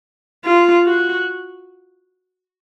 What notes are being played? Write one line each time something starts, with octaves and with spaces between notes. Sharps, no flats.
F4
F#4